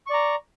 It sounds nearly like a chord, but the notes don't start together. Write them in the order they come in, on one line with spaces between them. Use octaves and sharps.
C#6 D5 A#5